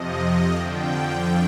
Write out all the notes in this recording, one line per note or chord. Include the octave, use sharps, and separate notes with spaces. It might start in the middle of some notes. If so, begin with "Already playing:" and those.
Already playing: F2 C3 F3 D#5
F2 D3 F3 G5